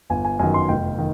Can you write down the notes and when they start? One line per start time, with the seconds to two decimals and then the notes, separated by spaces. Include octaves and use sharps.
0.10 G1 G#5
0.25 G#5
0.39 F#2 D#3 G#5
0.54 C6
0.69 F1 G5
0.98 D#3